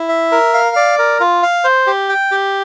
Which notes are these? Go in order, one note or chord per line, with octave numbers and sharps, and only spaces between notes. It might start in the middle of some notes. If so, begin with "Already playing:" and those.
Already playing: E4
E5
A#4
F5
D5
A#4
F4
F5
C5
G4
G5
G4